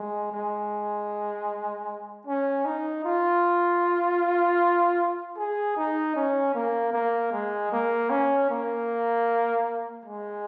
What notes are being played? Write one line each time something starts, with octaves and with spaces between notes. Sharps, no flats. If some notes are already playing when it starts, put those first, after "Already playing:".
Already playing: G#3
G#3
C#4
D#4
F4
G#4
D#4
C#4
A#3
A#3
G#3
A#3
C#4
A#3
G#3